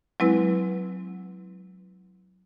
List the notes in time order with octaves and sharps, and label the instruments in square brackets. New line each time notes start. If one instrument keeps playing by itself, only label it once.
[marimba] F#3 G#3 C4 E4 B4